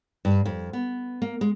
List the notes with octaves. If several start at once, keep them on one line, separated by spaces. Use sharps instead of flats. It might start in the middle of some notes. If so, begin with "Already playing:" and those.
G2
F2
B3
A#3
G#3